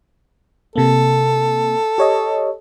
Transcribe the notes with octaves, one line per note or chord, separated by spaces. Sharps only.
C3 A#3 A4
G4 C#5 D#5